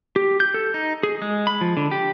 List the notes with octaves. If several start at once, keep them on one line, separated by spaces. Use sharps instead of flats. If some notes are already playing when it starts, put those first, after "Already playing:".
G4
G6
A4
D#4
G#4
G#3
B5
F3
D3
G4